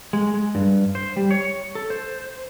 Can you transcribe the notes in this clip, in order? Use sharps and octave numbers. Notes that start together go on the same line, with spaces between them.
G#3
G#3
G2
C5
G3
C#5
A4
C5